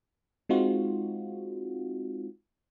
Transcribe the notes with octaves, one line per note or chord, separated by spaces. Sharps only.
G#3 C4 D#4 F4 F#4